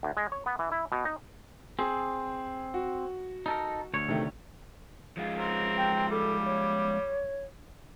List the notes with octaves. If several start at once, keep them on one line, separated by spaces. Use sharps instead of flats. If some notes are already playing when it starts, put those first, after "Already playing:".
D2
G#3
C#5
B3
E3
E4
B2
D#4
C4 G#4
F#4
D#4 A4 A#4
D2 C#5
C3 D#3 A3
F3 G#3 F4
C4 A#4
G5
G3 A4
C#5